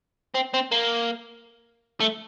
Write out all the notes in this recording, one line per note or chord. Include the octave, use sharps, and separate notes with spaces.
C4
C4
A#3
A3